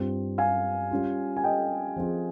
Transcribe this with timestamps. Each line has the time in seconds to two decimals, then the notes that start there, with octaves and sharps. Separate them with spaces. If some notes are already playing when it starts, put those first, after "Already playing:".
Already playing: G2 G3 C4 F4
0.38 F5 G#5
0.91 G3 C#4 F4
1.36 G#5
1.44 D#5 G5
1.96 F3 C4 F4 G#4